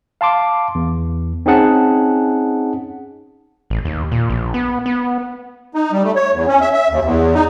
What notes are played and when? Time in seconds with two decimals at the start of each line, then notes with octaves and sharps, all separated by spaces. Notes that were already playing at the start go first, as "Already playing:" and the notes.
0.21 F5 A5 C6 D6
0.75 E2
1.46 C4 C#4 D#4 G#4 F#5 A5
3.70 A1
3.85 D#2
4.11 A#2
4.30 A#1
4.54 B3
4.86 B3
5.74 D#4
5.92 G3
6.04 A3
6.16 C#5
6.33 E2
6.48 C#4
6.61 E5
6.73 E5
6.90 D#2
7.04 E2
7.34 D#4